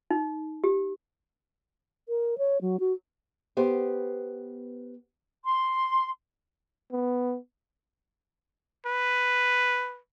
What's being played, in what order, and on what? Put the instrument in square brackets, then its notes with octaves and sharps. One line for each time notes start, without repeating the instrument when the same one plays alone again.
[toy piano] D#4
G4
[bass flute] A#4
C#5
F#3
F#4
[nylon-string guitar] B3 G4 C5
[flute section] C6
[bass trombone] B3
[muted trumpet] B4